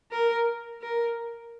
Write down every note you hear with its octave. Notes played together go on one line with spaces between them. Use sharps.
A#4
A#4